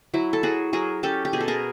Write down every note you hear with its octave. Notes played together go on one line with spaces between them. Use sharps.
F#3 E4
A4
F#3 F#4 G#4
F#3 G#4 A#4
C#4 G4 A4
G4
B2 G#4
A4
G#4 A#4